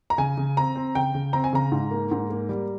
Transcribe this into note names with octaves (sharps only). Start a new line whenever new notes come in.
A#5
C#3 G#5
C#3
C4 A#5
C4
C#3 G5
C#3
C4 A#5
G#5
C#3 A#5
G#2
A#3
G#2
A#3
G3